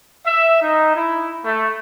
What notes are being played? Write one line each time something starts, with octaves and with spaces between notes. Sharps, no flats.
E5
D#4
E4
A3